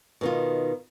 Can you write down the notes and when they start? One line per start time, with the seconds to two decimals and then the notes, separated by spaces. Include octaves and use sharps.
0.21 B2 D#3 F4